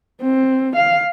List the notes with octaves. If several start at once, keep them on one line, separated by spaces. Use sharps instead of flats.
C4
F5